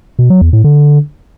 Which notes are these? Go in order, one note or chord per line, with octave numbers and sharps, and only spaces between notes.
B2
F#3
E2
A2
D3